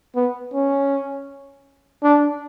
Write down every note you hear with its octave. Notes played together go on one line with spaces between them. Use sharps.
B3
C#4
D4